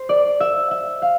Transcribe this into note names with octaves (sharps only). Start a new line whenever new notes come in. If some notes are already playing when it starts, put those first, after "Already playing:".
Already playing: C5
D5
E5
E5
F5